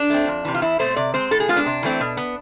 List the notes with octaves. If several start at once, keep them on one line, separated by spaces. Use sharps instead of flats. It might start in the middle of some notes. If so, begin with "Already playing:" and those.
Already playing: D4
A3 C4
F2
C3 E3
F4
E2 E4
B2 A3 C4 C5
C3 D5
G#3 C4 C5
A2 A4
G#4
G#3 B3 F4
D4
C3
E3 A3 C4
B2
B3